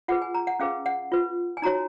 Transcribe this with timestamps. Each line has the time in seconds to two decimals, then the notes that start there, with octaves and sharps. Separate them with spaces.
0.08 F4 G#4 B4 F#5
0.22 G#5
0.34 A#5
0.47 F#5
0.60 C#4 G#4 B4 F5
0.86 F#5
1.12 F4 B4
1.57 G#5
1.62 D#4 F#4 C#5 A#5